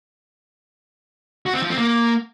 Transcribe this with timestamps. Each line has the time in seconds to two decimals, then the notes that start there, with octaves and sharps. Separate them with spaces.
1.46 F#4
1.54 C4
1.62 F3
1.70 C4
1.78 A#3